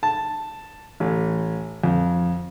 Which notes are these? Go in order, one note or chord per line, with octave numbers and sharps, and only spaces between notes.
A5
A1
F2